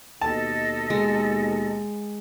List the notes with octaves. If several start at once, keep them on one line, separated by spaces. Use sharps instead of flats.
D#2 B2 A4 D#5 A5
G#3